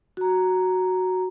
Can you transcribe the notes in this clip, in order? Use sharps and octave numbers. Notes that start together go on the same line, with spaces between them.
F#4 A#5